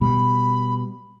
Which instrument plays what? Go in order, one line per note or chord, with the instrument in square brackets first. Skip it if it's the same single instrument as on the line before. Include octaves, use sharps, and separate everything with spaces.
[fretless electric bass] B2 G3 [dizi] B5